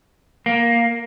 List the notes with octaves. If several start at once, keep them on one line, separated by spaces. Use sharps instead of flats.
A#3